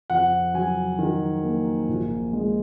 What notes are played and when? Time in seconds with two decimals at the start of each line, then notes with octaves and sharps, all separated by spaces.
0.10 F2 F#5
0.54 F#3 G#5
0.99 D#3
1.43 A#3
1.89 A#1
2.33 G#3